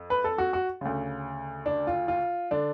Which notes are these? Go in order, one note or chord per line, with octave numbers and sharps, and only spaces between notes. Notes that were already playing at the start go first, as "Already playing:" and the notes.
Already playing: F2
B4
A4
F#4
F#4
D2 C#3
D4
F4
F4
D3 D4